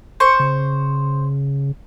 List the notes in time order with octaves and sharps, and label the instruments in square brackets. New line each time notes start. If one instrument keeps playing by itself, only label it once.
[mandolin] C5 C#6
[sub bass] C#3